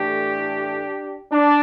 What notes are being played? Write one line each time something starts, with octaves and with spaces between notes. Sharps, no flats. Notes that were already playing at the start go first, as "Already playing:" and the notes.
Already playing: A2 E3 A3 D4 G4
D4